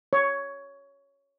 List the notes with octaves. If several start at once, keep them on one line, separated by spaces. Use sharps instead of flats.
C#5